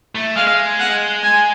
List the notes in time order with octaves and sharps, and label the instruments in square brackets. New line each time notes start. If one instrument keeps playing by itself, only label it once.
[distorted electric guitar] A3
[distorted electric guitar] G#3 [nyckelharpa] F5
[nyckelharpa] F#5
G#5